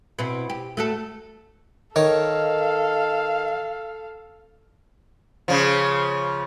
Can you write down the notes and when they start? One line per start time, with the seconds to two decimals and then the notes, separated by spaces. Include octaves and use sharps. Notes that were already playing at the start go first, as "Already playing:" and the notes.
0.19 B2 C4 E4
0.50 G4
0.77 A3 F#4 A4
1.96 D#3 A4 C#5 F5
5.48 C#3 F3